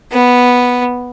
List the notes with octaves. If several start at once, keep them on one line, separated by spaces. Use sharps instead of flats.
B3